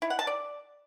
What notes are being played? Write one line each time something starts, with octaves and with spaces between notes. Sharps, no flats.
E4
F#5
A5
D5